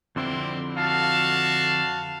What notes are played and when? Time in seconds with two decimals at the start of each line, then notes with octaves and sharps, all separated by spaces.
0.16 F2 D3 G3 C4 E4 C6
0.77 F#4 F5 A5